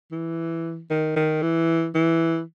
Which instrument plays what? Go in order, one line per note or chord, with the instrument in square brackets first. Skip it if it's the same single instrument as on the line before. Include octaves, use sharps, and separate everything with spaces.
[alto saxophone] E3
D#3
D#3
E3
E3